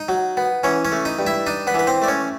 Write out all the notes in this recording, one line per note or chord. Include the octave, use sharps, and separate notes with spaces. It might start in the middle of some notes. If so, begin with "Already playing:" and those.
Already playing: D#4 D#5
F#3
B3
E3 C#4 C#5
C#4 C#5
A3
D#4 D#5
G2
E4 E5
D4 D#4 D#5
B3 B4
E3
B4
C4 C5
A3 D5
C#4 C#5